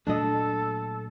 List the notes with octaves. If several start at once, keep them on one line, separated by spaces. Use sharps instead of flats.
A#2 F#3 A3 D4 A4 D#5